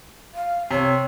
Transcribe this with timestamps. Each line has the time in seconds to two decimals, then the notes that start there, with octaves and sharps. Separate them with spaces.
0.34 F5
0.71 C3 C#5